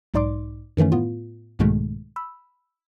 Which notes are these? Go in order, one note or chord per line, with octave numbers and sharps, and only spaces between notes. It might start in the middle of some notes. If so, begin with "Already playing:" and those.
B1 G#2 D#4 D5 C6 D6
F#2 D#3 E3 A3 C#4
A2 B3 F4
C2 G#2 B2 D#3 G#3 A3
B5 E6